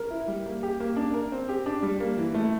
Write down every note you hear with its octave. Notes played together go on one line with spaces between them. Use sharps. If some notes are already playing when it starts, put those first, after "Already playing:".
Already playing: A#4
E4
G3
A#3
G4
A#3
D4
A#4
C4
G4
D4
G3
A#3
E3
A3